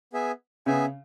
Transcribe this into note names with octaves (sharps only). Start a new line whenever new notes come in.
B3 G#4 E5 G#5
C#3 B3 G#4 E5 G#5